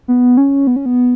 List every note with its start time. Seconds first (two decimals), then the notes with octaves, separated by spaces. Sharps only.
0.08 B3
0.37 C#4
0.67 B3
0.76 C#4
0.86 B3